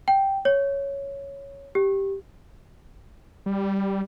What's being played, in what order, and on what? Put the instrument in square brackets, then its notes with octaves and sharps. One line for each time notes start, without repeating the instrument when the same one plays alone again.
[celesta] G5
C#5
G4
[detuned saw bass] G3